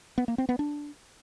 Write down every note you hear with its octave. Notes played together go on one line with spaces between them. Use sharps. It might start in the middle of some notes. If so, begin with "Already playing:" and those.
B3
A#3
C4
B3
D4